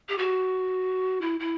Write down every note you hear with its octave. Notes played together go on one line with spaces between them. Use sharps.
G4
F#4
E4
E4